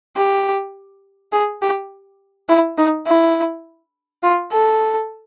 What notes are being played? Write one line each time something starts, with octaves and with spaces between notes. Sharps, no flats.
G4
G#4
G4
E4
D#4
E4
F4
A4